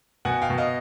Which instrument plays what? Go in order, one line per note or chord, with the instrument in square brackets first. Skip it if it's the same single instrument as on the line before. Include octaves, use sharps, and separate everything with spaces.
[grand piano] B2 F#5 G#5
F5 G5
B2
D#5 F5